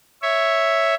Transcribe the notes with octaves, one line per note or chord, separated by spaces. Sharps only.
C#5 E5